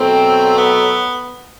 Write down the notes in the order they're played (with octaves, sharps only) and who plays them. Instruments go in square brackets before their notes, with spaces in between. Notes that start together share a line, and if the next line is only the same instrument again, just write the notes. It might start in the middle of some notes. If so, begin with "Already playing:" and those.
Already playing: [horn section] B2 F#3 A3 C4
B3